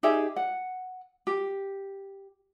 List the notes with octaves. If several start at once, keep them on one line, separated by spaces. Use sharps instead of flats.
D#4 G4 G#4 E5
F#5
G4